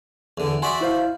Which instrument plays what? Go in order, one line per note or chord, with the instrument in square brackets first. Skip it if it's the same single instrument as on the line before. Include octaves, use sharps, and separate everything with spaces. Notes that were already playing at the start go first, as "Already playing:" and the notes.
[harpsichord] E2 D3
[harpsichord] F#4 D5 E5 [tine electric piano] G#5 C6
[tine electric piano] E4 C5 F5